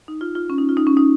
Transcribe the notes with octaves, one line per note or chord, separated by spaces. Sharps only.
D#4
F4
F4
C#4
D#4
F4
D#4
C#4
D#4